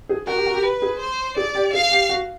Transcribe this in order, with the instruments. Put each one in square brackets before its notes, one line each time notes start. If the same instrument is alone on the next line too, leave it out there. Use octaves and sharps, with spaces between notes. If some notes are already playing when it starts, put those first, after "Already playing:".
[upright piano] G#4
[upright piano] F#4 [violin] A#4
[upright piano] G4
F#4
G4
[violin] B4
[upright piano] G#4
[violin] C5
[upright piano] G#4 [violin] D5
[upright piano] G4
[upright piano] G#4 [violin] F5
[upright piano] G4
F#4